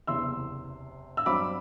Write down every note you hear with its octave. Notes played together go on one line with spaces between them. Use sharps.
F#1 E2 C3 C6 E6
E6
G2 F#3 C4 B5 D6